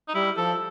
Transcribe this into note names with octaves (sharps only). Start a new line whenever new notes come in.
D#4
G3 E4
F3 A4